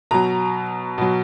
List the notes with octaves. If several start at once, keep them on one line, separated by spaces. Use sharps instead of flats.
B2 F#3 A#5
B2 F#3